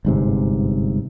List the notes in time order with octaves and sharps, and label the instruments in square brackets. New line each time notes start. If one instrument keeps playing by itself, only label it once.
[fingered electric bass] G1 G#2 C3